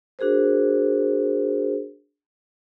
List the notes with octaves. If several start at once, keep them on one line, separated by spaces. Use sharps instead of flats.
D4 F#4 G#4 A#4 C5